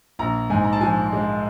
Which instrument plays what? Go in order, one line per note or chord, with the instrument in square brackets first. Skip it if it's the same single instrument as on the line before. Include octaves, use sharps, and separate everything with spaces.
[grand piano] A#1 A#5
G#2 G#5
A#5
A5
F3 G#5
G#3